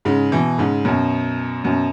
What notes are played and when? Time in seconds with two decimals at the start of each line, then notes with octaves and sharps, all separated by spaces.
0.05 G#2 C#3
0.32 B2 E3
0.58 G#2 C#3
0.85 F#2 B2
1.64 F#2 B2